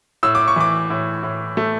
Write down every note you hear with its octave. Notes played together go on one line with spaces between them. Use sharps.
A2 E6
D6
C#6
E3 D6
A2
A2
A3